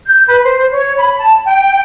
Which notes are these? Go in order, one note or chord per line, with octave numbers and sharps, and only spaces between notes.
G6
B4
C5
C#5
B5
A5
G5